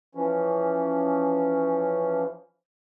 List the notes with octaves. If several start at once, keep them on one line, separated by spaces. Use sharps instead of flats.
E3 F3 C#4